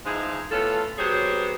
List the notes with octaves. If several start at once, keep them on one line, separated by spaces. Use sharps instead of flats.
G#2 E3 F3 G#3 D#4 G#4
A2 B3 C#4 F4 A4
F#3 B3 G4 G#4 C5 C#5